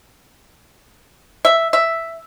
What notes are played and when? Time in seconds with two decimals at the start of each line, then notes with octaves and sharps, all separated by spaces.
1.45 E5
1.73 E5